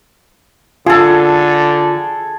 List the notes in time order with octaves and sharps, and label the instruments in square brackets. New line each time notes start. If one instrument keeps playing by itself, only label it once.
[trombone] D3 [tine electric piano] F4 [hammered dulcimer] G#4 A4